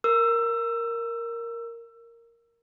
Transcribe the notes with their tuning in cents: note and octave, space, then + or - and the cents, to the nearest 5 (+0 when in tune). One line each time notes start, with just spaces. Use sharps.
A#4 +0 E6 +25